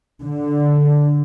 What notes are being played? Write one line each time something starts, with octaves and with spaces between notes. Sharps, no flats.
D3